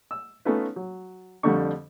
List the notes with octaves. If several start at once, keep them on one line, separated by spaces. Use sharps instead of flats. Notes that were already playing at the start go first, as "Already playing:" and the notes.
E6
A3 B3 C#4 D#4 F4 B4
F#3
F2 D3 G3 A3 D4 C#6